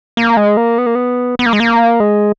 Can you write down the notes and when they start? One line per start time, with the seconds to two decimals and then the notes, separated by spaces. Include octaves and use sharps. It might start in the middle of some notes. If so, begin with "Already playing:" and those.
0.17 A#3
0.37 G#3
0.57 A#3
0.78 B3
0.86 A#3
0.95 B3
1.39 B3
1.46 A#3
1.53 G#3
1.60 A#3
2.00 G#3